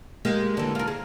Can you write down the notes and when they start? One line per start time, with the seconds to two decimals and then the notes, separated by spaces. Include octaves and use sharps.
0.25 G#3 A#3 G4
0.57 D3 E3
0.75 F4 A#4
0.87 G#4